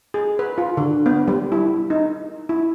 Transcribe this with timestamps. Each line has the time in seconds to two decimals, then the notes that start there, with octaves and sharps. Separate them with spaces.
0.14 G#4
0.39 B4
0.58 F4
0.77 D3
1.06 B3
1.28 G3
1.52 E4
1.90 D#4
2.49 E4